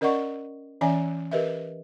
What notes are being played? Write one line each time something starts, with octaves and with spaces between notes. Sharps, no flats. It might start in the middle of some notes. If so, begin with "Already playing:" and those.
C#4 A#4 D5 D#5 F#5 C#6
E3 C#4 D5 E5 G#5
G4 A#4 B4 D#5 E5